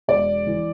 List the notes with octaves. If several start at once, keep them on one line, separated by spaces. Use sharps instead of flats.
E1 D5
E3